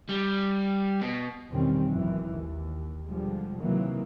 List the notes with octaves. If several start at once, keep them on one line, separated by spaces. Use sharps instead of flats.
G3
B2
E2 B2 D#3 G3 C4 C#4
G#1 F#2 D#3 E3
D#2
B2 D3 F3 G3 G#3
C3 D#3 E3 F#3 A#3